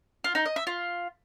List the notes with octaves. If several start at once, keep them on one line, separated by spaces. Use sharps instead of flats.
F4
D#4
D#5
E5
F4